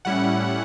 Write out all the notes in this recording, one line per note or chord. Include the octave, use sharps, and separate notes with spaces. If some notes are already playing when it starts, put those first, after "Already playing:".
A2 G3 C#4 E4 F#5